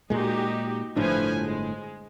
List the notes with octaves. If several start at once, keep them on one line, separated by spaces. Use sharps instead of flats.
A#2 G#3 D#4 F#4 G4
G1 A2 F3 D4 B4 G#5
G#3